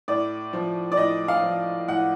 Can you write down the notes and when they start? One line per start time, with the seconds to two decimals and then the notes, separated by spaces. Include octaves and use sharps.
0.08 A2 D5
0.53 F3
0.92 D5
0.97 A2 D#5
1.28 F5
1.42 F3
1.88 A2 F#5